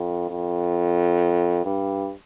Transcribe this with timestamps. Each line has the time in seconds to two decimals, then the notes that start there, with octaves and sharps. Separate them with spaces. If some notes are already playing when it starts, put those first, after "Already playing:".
Already playing: F2
0.30 F2
1.65 G2